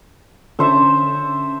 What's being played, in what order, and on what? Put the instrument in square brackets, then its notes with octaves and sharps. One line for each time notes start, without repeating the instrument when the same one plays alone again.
[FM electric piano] D3 C#4 [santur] A4 C5 E5